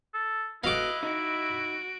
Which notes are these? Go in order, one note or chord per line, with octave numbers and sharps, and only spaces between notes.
A4
B3 E4 F#4 A4 D#5 F5 D6 F#6
D#4 F#4 D7